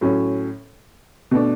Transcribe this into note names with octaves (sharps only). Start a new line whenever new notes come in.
A2 F#3 C#4
B2 A3 D4